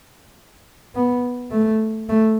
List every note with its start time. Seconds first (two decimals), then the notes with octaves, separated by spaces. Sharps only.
0.95 B3
1.52 A3
2.09 A3